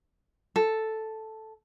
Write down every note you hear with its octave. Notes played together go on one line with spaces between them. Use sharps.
A4